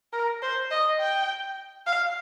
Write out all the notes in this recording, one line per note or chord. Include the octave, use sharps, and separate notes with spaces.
A#4
C5
D#5
G5
F5